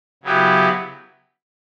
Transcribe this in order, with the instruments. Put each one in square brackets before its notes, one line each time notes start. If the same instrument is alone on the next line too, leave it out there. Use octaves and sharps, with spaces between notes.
[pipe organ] C#3 F#3 B3 E4 G4